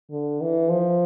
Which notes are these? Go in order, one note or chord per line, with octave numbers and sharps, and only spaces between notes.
D3
E3
F3